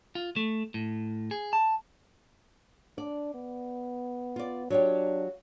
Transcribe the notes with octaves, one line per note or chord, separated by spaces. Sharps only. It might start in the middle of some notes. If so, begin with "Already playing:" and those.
F4
A3
A2
G#4
A5
D4 D5
B3
F4 D5
F#3 D4 F4 G4